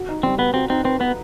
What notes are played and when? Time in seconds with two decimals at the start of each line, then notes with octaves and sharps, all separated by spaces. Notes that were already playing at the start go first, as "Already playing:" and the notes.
Already playing: F#4
0.09 D#4
0.23 G3 C4
0.38 B3 B4
0.54 C4 F#4
0.69 C4 D#4
0.84 C4 B4
1.00 B3 B4